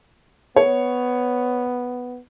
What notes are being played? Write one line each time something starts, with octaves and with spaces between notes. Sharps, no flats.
B3 C#5